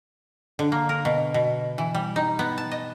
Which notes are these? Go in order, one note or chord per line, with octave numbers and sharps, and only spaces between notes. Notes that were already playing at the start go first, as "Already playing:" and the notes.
D3
A#3
A#4
B2
B2
E3
G3
D#4
B3
A5
D#5